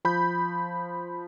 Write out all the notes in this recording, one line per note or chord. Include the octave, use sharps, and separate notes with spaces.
F3 B5 G6